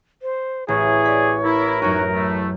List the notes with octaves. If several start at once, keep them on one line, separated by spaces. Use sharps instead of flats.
C5
A1 G#4 C#5
D5 B6
E4 A#4
F#2 C#4 D#4 F#4
A2 A3